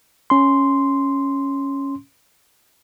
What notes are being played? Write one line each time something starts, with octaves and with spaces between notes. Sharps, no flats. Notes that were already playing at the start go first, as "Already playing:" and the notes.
C#4 C6